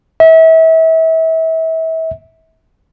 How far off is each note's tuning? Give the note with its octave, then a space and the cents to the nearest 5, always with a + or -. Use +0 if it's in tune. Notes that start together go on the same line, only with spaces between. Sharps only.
E5 -35